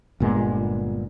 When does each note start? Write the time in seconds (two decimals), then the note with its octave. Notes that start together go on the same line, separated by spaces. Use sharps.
0.20 G1 A#2 G#3 B3